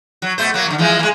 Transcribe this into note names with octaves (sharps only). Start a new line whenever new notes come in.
F#3
B2 A3 C5
F#3 A#3
F2 D3
E3 F3 G#3
G#3 A#3